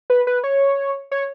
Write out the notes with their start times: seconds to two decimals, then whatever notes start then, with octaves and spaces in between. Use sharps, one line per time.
0.10 B4
0.27 B4
0.44 C#5
1.12 C#5